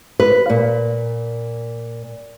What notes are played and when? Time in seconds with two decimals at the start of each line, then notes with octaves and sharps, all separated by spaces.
0.20 B4
0.50 A#2